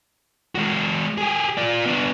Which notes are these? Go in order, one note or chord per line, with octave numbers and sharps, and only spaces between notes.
G#3 F#4
G4 G#4
F4 D5
B3 D4